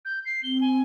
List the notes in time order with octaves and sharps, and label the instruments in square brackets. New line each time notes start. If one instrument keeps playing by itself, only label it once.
[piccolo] G6
C7
[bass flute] C4 [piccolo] G7
[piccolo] G#5